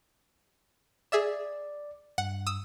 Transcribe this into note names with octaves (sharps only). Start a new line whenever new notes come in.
G#4 D5 E5 E7
G2 F#5
D#6 E6